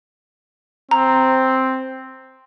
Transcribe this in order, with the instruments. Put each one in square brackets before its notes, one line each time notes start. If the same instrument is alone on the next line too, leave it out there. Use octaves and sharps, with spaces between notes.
[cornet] C4 [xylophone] A#5